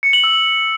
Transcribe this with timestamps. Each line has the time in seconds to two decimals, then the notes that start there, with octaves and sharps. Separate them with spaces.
0.03 C#7
0.13 F#7
0.24 E6